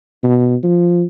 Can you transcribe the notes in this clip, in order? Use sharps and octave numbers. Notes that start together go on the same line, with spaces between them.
B2
F3